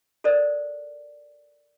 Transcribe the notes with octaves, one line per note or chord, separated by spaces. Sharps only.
A4 A#4 C5 D5